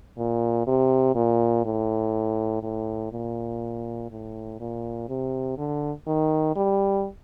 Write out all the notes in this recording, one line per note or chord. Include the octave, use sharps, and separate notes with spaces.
A#2
C3
A#2
A2
A2
A#2
A2
A#2
C3
D3
D#3
G3